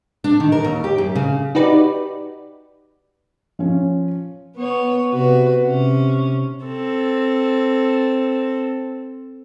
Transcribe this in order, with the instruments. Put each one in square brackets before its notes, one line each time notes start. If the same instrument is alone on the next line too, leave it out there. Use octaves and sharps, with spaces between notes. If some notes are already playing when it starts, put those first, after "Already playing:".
[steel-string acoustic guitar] D4
D#3
A#4
D#2
G4
F#2
C#3
[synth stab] D#4 F#4 G4 B4 D5
[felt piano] F3 C#4
[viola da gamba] B3 C#5
C3 F#4 B4
C3 C#4
[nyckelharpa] C4 A4